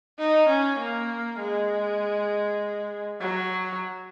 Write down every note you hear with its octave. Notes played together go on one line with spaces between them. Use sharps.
D#4
C#4
A#3
G#3
F#3